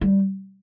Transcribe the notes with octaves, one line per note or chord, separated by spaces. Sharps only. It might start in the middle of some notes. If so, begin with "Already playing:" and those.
G3